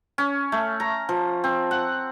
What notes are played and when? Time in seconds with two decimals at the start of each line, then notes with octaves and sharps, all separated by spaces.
0.18 C#4
0.52 A3
0.80 A#5
1.09 F3
1.44 C4
1.71 F#5